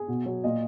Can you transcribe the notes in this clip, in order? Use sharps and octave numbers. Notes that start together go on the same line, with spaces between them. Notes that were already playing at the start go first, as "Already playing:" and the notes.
Already playing: G#4
B2
F#3
A#2 D#5